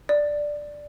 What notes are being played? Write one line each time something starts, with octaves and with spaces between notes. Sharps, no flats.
D5